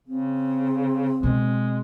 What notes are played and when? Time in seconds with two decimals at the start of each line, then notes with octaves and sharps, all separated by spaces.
0.08 C#3 C4
1.23 B2 G#3 B3